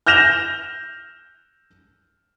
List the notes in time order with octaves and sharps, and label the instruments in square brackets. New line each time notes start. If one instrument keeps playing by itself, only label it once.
[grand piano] F6 G6 A#6 E7 F7 G7